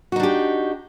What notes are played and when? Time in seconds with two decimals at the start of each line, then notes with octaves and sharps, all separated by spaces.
0.12 F#4
0.16 D#4
0.20 D4
0.23 G4